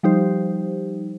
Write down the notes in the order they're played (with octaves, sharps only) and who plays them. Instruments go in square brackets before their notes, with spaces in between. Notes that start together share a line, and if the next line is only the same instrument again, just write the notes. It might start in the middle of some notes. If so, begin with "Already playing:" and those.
[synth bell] F3 G3 D#4 G4 C5